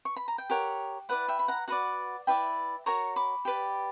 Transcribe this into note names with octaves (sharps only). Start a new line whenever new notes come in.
C#6
B5
A#5
G5
G4 A#4 C#5 F#5
E4 B4 D5 F#5
E5 G5
B5
F#5 A#5
F#4 B4 D5 F#5 A#5
E4 B4 D5 E5 G5
F#4 A#4 C#5 A#5 C#6
B5 D6
G4 B4 D5